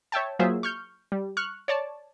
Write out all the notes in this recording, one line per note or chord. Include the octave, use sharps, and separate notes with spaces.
C#5 E5 G5 A5
F#3 A#3 F4 G#4 C5 E5
C#6 F6 G6
G3
C#6 F6 F#6
C#5 D5 A5